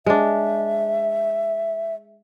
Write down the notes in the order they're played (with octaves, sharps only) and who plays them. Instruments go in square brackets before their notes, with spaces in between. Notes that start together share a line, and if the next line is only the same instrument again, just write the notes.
[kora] G#3 D4 [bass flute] E5